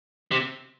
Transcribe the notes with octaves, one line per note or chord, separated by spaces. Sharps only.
C3